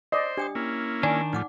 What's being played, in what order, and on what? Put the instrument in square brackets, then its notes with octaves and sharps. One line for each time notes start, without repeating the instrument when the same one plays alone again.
[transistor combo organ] C5 [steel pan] D5 D#5
[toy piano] D4 G5 D#6 [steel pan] G4
[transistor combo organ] A#3 C#4 E4
[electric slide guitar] D#3 D4 [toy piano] D5 G#5
[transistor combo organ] A2 F3 [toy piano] D#4 F#5 D6